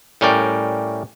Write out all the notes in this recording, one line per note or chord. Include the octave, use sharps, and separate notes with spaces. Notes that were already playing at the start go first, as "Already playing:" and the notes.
A2 G3 C#4 A#4 D5 G5